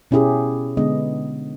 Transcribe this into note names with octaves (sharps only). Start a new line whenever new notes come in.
B2 C#4 E4 G4 G#4
D3 G#3 B3 D#5